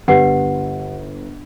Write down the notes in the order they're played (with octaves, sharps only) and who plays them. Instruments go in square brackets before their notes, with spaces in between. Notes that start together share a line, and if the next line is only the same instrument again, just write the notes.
[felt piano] G1 C7 [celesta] G4 B4 F#5